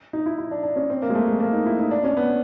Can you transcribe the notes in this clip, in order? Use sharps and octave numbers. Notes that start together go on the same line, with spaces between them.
D#4
E4
E4
D4
D4
C#4
C4
A#3
G#3
A3
G#3
A#3
D#4
E4
D#4
D4
C#4
B3